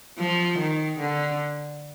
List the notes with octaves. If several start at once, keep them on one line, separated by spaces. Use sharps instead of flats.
F3
D#3
D3